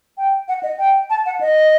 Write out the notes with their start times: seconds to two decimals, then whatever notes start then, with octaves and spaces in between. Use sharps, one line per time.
0.18 G5
0.48 F#5
0.63 D#5
0.79 G5
1.10 A5
1.26 F#5
1.41 D#5